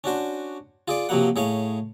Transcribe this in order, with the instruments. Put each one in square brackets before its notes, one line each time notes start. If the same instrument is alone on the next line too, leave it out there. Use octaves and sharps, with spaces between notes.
[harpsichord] C#4 D4 F#4 C5
F4 G#4 D5
C3 F3 F#3 A#3 F#5
A2 G#4 C#5 F5